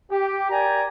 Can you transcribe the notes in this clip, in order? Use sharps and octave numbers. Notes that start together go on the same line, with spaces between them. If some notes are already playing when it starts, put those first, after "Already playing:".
G4
A#4 D5 G5 G#5 A#5